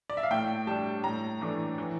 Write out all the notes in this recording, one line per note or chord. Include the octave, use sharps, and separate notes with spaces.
D5
E5
F5
A2 G5
G3 D4 A5
A2 A#5
E3 A3 D4
E3